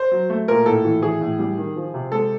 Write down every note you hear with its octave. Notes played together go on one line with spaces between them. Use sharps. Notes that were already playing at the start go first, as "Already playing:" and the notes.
Already playing: C5
F#3
A3
A#2 A#4
A2 A4
E3
E3 G#4
A2
G3
D#3
F3
C3
G#3 A4